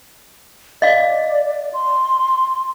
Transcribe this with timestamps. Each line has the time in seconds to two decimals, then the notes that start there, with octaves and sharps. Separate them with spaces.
0.82 D5 D#5 F5
1.74 C6